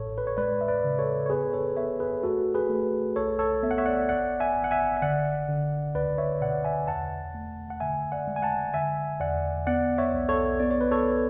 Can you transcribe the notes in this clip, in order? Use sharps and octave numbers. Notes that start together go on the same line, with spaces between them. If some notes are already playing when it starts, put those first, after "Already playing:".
Already playing: A1 A2 A4 C#5
B4
C#5
G#3 B4 D5
E5
B4 D5
C#3
A4 C#5
C#5
B3 G#4 B4
A4 C#5
B3 C#5 E5
G#4 B4
A3 F#4 A4
G#4 B4
A3
B1 A4 C#5
A4 C#5
B3 E5
F#5
C#5 E5
D5 F#5
G#1 D5 F#5
E5 G#5
G#1
F#5
E5 G#5
E5
D3 D5 F#5
D3
C#2 B4 D5
C#5 E5
B2 D5 F#5
E5 G#5
E2 F#5 A5
A3
F#5
D3 E5 G#5
D5 F#5
G#3
G#5
F#5 A5
D3 E5 G#5
E2 D5 F#5
B3 D5 F#5
C#5 E5
B1
A4 C#5
B3 D5
C#5
B4
A4 C#5